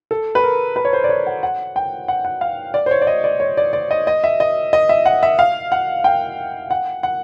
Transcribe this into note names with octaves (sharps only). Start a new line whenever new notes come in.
A4
B4
A#4
B4
C#5
C5
D5
C#5
F#5
F#5
G5
F#5
F#5
F5
D5
C5
C#5
D5
D#5
D5
C#5
D5
D5
D#5
D#5
E5
D#5
D#5
E5
F#5
E5
F5
F#5
G5
F#5
F#5